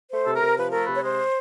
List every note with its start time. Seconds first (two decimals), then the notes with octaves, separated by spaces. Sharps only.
0.12 A3 C5
0.27 C3 A4
0.35 A#4
0.42 C3
0.57 F3 B4
0.71 A3 A#4
0.85 C3 B4
0.95 C#5
1.03 G#3 C5